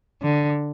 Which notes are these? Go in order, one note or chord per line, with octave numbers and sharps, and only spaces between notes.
D3